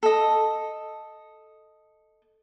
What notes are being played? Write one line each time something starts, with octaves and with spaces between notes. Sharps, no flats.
A4 D#5